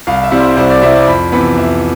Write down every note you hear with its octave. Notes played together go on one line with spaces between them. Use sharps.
C2 F5
E5
C3 G3 C4 E4
C5
C2 C5
D5
C3 G3 C4 E4 E5
D5
F2 B5
C3 E3 B3 B5
F2 E5